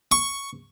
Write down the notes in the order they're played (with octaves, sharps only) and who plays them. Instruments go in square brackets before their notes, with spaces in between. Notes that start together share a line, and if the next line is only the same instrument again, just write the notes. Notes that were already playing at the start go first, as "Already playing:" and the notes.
[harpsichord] C#6